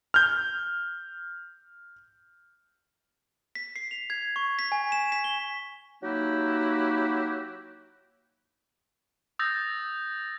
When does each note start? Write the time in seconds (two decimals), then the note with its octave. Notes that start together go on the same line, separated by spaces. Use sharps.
0.14 F6 G6
3.55 B6
3.76 C7
3.91 F7
4.10 G#6
4.36 C#6
4.59 B6
4.72 G#5
4.92 E7
5.12 B6
5.24 G7
6.03 F#3 A#3 D#4 E4 F#4 G4
9.39 D#6 E6 G6 A6 A#6